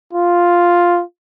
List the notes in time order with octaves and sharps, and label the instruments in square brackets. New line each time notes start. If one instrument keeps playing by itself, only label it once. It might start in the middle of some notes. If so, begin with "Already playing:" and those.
[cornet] F4